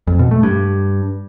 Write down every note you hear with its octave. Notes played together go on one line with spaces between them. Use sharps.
F2
B2
A3
G2